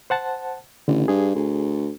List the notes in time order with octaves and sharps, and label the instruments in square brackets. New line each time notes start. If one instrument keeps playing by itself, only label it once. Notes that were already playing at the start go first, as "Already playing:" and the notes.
[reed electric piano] C5 F#5 A5
[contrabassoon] A1 [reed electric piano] D3
[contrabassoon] G2 [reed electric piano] G#4
[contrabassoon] D2